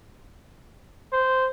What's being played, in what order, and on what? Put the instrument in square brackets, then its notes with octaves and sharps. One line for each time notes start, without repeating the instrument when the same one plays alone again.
[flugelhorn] C5